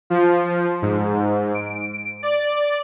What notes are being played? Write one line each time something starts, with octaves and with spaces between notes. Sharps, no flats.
F3
G#2
D7
D5